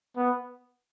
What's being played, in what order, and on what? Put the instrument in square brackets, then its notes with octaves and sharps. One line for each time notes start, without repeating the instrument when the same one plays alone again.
[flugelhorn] B3